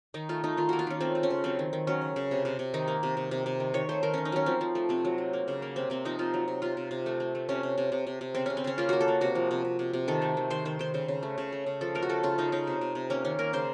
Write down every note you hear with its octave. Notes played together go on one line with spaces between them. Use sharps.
D#3 D#4
A3 F4
A3 D#4
D#3 F4
A#3 F#4
F4
D#3 C#4
A3 C4
A3
C#4
C#3
F#3 C4
D#3
D#3
F#3 C#4
C#3
C#3
C3
C3
C3
D#3 D#4
A#3
C3
C3
C3
C3
D#3
D#3 C#5
A3 C5
D#3 A#4
D#3 C#4
D#4
F#3 C#4
F3 C4
F3
A3
C3 C4
F#3
A3
A#3
C#3
A#3
C3 C4
C3 C4
F3 D#4
C3 F4
F#3
C3
C3 F4
C3
C3
A3
A3
A3
C3 C#4
C3
C3
C3
C3
C3
C#3 C4
C#3 C#4
C4
C#3 C#4
A#3 F4
A#3 F#4
A4
A#3
C3 F#4
F3
C3
C3
C3
C3
D#3 A4
A3
D#3
D#3 C5
D#3 C5
D#3 C5
C#3 C5
C#3
A3
C#3
A3
C#3
F3 A4
A3 A#4
F#4
A3 A4
C#3 F4
C#3 D#4
C#3 D#4
C3
C3
C3
A#3 C#4
D#3 C#4
A#3 A#4
C#3 C5